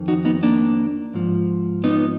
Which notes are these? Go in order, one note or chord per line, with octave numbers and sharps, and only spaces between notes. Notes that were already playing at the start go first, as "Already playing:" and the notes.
Already playing: F2 D#3
D#4 F#4
B3 D#4
A#3 D4
G#2 F3
B3 D#4